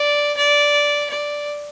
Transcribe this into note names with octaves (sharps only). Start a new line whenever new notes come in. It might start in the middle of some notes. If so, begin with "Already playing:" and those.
Already playing: D5
D5
D5